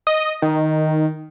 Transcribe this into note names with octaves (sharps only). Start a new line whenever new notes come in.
D#5
D#3